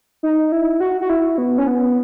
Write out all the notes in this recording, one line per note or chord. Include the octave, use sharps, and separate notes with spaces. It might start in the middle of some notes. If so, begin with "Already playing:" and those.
D#4
E4
F#4
F#4
E4
B3
C#4
B3